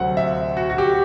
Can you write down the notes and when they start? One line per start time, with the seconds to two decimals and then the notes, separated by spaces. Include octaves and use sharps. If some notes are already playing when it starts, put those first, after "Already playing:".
Already playing: D2 C3 F#3 C4 F#5
0.17 E5
0.57 F#4
0.70 F#4
0.78 G4